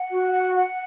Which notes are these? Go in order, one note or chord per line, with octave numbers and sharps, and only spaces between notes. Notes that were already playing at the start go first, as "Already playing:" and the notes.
Already playing: F#5
F#4
F#5
F#5